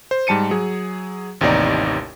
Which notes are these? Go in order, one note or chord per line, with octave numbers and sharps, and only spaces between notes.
C5
G#2 G3 A5 C#7 D#7
F#3 G#4
A1 D#2 C3 D#4 D5